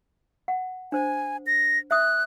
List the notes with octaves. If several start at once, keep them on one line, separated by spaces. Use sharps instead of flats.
F#5
D4 C5 G#5
A#6
E5 D#6 F#6